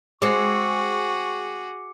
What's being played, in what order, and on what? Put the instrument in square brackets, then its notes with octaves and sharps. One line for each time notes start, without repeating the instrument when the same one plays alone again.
[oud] G#3 C4 [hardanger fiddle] F#4 G#4 [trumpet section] C#6 [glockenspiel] D6 C#7